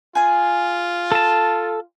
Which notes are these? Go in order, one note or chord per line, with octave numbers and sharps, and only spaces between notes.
F4 G#4 G#5
A4 A5